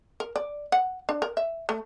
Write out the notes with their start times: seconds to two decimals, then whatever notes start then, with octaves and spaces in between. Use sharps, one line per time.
0.20 A#4
0.36 D5
0.72 F#5
1.09 D4
1.22 A#4
1.37 E5
1.69 A3